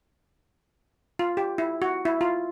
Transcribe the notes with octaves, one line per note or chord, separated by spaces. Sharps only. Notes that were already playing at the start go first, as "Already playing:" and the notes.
F4
G4
E4
F#4
E4
F4